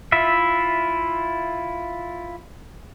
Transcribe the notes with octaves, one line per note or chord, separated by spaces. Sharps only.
E4 F4 E5